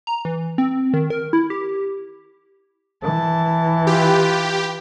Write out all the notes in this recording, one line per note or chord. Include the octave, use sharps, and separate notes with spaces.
A#5
E3
C4
D#3
A#4
E4
G4
E3 A5
F4 G4 B4